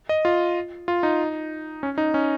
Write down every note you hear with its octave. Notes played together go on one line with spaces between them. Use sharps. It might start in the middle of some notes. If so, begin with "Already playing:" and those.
D#5
F4
F4
D#4
C#4
D#4
C#4